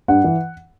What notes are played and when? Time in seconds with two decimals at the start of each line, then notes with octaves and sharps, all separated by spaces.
0.08 G2 F#5
0.24 E3